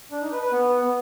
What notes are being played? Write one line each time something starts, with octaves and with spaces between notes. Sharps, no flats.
D4
D#4
B4
B4
B3